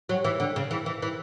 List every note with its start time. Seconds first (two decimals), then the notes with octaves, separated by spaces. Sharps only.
0.09 F#3
0.25 E3
0.40 D3
0.56 C#3
0.71 E3
0.86 E3
1.02 E3